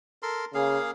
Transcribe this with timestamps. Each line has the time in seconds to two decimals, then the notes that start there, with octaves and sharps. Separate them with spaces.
0.23 A4 A#4 C6
0.54 C#3 A#3 G#4 F5